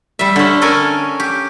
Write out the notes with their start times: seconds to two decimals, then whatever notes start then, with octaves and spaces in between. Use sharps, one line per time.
0.19 G3 E5
0.36 D3 C#4
0.61 C#4 A4 A#4 G#5
1.20 G4